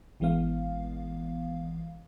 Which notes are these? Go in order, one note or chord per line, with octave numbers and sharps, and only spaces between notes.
G#1 E3 G#3 B3 F5